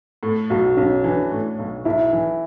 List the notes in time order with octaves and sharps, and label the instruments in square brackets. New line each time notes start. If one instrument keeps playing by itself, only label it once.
[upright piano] A2
[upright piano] B1 [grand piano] F#4
[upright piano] B1 [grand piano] C#4
[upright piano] E3 [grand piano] D4
[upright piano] A2
B1
[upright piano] B1 [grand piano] E4
[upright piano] E3